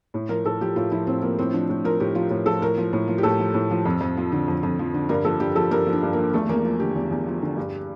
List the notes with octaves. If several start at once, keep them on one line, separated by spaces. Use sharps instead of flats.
A2
F3 A#4
A2 A4
F3 G4
A2 F4
F3 E4
A2 C4
F3 A#3
A2 C4
F3 D4
A2
F3 A#4
A2 G4
F3 F4
A2
F3 A4
A2 A#4
F3
A2
F3
G4
A2 A4
F3
A2
F3
F2
F2
F3
D3
F2
F2
F3
D3
G2 A#4
F3 A4
G2 G4
F3 A4
G2 A#4
F3
D4
G2
F3 A#3
E2 A3
E2 A#3
F3
D3 G4
E2
E2
F3
D3
G2